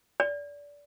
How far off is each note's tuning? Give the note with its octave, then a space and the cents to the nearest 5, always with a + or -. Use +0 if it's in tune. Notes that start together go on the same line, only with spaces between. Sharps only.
D5 -25